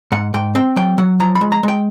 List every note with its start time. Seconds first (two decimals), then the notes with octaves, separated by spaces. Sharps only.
0.12 G#2 F#5
0.34 G#2 G5
0.55 C4 G5
0.76 F#3 G5
0.98 F#3 F#5
1.20 F3 A#5
1.35 B5
1.41 G#3
1.52 A#5
1.63 G#3 G5